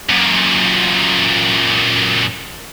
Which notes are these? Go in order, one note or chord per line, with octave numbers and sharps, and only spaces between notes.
F#2 A#2